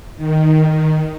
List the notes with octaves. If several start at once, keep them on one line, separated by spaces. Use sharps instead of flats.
D#3